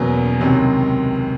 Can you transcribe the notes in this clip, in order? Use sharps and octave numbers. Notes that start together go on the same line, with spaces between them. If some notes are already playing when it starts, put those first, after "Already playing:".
Already playing: E2 B2 F#3 A#3 C#4
C#2 C3 D#3 F#3